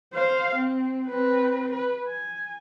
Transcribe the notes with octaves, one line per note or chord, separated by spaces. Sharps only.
C5 F5
C4
C4 B4
B4
G#5